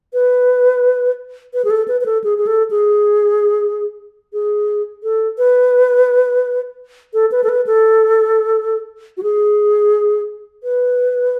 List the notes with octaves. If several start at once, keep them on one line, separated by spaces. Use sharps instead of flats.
B4
B4
G#4
A4
B4
B4
A4
G#4
G#4
A4
G#4
G#4
A4
B4
A4
B4
A4
B4
A4
F#4
G#4
B4